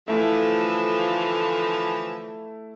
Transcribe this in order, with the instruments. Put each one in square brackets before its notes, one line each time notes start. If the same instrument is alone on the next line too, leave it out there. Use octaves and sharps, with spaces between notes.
[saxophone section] D3 E3 F3 [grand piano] A3 E4